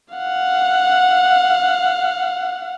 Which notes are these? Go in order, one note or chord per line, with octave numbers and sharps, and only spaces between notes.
F5 F#5